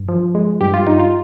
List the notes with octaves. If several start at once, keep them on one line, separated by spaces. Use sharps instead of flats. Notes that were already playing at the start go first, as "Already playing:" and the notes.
Already playing: G2
F3
G#3
G2 G4
F4
G2 D#4
F4